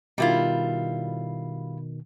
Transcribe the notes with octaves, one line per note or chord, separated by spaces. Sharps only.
B2 D#3 G3 E4 F4